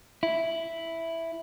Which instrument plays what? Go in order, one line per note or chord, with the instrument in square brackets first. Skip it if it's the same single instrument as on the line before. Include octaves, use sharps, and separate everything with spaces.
[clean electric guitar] E4